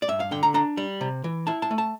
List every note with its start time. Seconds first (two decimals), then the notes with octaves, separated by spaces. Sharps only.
0.02 D5
0.08 G2 E5
0.20 F5
0.31 D3 G5
0.43 A#5
0.54 D4 A#5
0.77 G3
1.01 C3
1.24 E3
1.47 E4 A5
1.62 A5
1.71 A3
1.78 A5